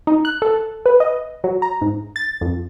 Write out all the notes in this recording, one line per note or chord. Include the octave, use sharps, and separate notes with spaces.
D#4
F#6
A4
B4
D#5
F#3
A#5
G#2
A6
F2